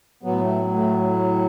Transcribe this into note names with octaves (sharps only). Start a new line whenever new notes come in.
A2 F#3 B3
A3
A3